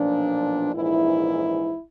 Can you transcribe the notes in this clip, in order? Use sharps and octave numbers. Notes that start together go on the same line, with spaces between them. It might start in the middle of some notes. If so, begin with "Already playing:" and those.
Already playing: B1 A#2 F3 D4
A#1 G#2 E3 E4